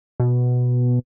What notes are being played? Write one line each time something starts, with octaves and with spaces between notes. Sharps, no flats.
B2